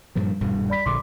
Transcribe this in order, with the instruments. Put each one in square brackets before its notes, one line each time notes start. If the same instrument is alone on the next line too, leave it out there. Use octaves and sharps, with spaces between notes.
[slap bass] G2 A#2 F3
D#1 G2 B2
[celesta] D5 B5 B6
[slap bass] A#1 D3 [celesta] C6 D6